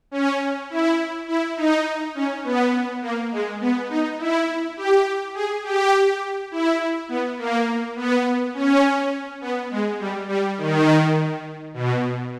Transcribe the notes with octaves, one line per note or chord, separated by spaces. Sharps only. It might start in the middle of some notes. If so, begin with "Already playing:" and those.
C#4
E4
E4
D#4
C#4
B3
A#3
G#3
B3
D#4
E4
G4
G#4
G4
E4
B3
A#3
B3
C#4
B3
G#3
G3
G3
D#3
B2